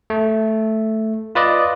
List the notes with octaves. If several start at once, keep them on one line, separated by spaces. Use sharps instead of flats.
A3
F4 B4 D5 D#5